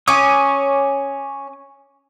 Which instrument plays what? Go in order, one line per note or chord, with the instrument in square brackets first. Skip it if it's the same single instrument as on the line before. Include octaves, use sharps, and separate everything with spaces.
[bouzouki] C#4 [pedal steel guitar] G#5 D6 D#6